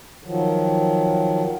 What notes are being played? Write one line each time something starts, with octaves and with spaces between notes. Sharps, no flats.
D#3 F3 F#3